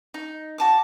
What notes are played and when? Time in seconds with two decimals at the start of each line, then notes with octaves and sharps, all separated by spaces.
0.14 D#4
0.58 F#4 A5 D6